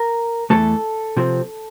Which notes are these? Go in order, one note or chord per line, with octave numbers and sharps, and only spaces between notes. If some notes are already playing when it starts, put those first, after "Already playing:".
Already playing: A#4
E2 E3 A3 A4
C3 F3 C4